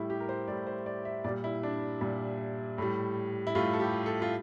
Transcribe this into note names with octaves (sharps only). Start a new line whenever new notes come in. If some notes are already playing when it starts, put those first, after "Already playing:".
Already playing: A2 G3 E4
G4
A#4
C5
A2 G3 D5
C5
D5
E5
A#2 G3 D5
E4
D4
A#2 G3
A2 G3
E4
A2 G3 F4
A4
G4
A4
F4